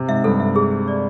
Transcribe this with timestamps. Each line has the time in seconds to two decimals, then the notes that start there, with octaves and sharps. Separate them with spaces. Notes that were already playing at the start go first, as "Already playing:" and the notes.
Already playing: C3
0.09 G#2 E5
0.24 G2 A4
0.40 E5
0.56 G#4
0.71 G#4
0.88 D5